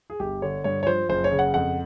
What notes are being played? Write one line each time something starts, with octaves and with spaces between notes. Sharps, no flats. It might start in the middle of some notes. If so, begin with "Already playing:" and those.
G#4
G1 G4
D3 C#5
G2 C#5
C#5
F3 C5
F#1 C5
C#5
C#3
F#5
F2 F#5